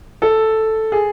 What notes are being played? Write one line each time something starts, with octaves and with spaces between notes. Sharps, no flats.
A4
G#4